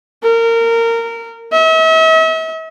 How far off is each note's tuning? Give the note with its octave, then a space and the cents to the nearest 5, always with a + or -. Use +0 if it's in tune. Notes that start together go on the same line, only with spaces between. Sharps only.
A#4 -20
E5 -45